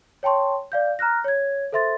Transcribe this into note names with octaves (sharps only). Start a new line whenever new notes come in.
C#5 G5 A5 C6 C#6
D5 F5 G6
A#5 F6 F#6 A#6
C#5 G#6
A4 C5 E5 C6 A6